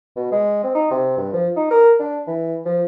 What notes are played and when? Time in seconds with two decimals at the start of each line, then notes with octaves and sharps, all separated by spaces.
0.16 B2
0.32 G#3
0.63 C4
0.75 D#4
0.91 C3
1.17 G2
1.33 F3
1.56 D#4
1.71 A#4
2.00 D4
2.27 E3
2.65 F3